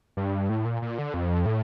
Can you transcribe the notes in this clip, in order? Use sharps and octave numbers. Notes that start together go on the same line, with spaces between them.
G2
A2
A#2
A#2
D3
F2
A2